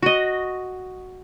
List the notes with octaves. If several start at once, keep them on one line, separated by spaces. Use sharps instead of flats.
F#4 D#5